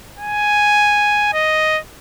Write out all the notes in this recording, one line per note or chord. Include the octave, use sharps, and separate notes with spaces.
G#5
D#5